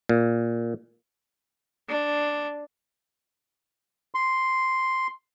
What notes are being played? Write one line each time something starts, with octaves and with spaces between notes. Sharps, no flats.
A#2
D4
C6